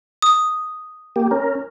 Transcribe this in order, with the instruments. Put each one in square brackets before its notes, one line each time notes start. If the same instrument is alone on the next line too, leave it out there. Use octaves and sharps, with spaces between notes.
[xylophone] D#6
[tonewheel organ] A#3 G4
C#4 A#4